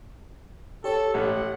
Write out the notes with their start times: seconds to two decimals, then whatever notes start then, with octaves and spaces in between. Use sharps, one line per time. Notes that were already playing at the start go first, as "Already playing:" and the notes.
0.84 G4 A4 C#5
1.14 A1 F#5